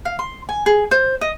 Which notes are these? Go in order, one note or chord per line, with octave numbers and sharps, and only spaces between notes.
F5
C6
G#5
G#4
C5
D#5